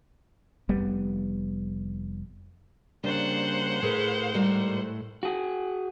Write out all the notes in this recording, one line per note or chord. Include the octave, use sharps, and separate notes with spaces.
F1 G3 B3
C#3 G3 A#3 D4 C5 F#5
A2 G#4 A#4 B4
G#2 G3 A#4
F#4 G#4